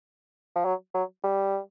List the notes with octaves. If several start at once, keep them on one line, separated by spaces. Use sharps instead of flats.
F3
F#3
F#3
G3